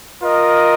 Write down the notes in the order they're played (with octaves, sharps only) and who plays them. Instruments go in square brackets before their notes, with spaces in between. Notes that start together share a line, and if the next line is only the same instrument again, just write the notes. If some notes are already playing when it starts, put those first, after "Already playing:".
[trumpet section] F4 A#4 D#5